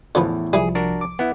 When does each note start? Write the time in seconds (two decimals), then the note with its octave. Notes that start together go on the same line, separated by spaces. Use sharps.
0.15 E2 A2 D3 F3 B3
0.53 C2 E3 F3 G3 G#4
0.75 D4 F#4 A#4
1.01 D6
1.19 B3 E4 F#5